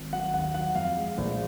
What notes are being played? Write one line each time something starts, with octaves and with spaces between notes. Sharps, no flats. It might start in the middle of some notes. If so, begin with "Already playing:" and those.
Already playing: G#1
F#3 F#5
D#2 F#5
F#3 F#5
F2 F5
G#3
A#1